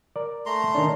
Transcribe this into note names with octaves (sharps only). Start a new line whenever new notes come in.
A#4 D5
A3 A#5 C6
D#3 C#4 D4